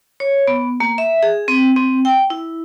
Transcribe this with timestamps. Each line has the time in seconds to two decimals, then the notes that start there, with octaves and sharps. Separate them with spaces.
0.20 C#5
0.48 B3
0.80 A#3
0.98 E5
1.23 G#4
1.48 C4
1.76 C4
2.05 G5
2.30 E4